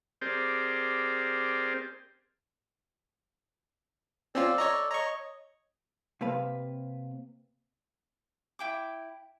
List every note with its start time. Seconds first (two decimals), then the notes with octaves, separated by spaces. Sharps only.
0.21 C4 G4 G#4 A#4 C5 D5
4.35 C4 C#4 F4 A4 D5
4.58 C#5 D#5 A#5
4.91 C#5 D#5 A#5 C#6
6.21 C3 A#3 B4 F5
8.59 E4 G5 D6